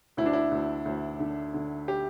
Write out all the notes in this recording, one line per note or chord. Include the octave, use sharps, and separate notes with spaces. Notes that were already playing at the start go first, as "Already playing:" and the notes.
D2 E4
D4
E4
D2
D2
D3
D3
G4